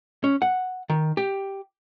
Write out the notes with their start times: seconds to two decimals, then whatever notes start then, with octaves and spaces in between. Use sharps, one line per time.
0.24 C#4
0.42 F#5
0.90 D#3
1.17 G4